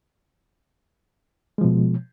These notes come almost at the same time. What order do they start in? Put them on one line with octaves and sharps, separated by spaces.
G#3 F3 B2